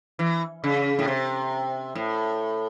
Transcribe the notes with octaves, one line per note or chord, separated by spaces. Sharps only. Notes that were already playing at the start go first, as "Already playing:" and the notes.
E3
C#3
A2
C3
A2